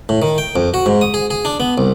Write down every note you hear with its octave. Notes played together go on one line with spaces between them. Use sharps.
A2
D#3
G5
F2
F#4
G#2
D#6
G#4
G#4
D4
B3
C2